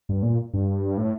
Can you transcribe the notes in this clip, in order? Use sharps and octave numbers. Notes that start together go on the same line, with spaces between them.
G2
A#2
G2
A2